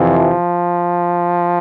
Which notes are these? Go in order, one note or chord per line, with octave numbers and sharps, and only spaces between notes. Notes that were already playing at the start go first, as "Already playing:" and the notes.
Already playing: F2 C3 E3
F3